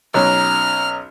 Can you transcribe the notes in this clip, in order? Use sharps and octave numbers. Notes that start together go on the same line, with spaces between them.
B1 F#3 C#4 A#5 F6